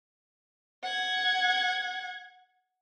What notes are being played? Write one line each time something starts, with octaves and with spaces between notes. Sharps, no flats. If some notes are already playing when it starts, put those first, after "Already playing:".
F#5 G#6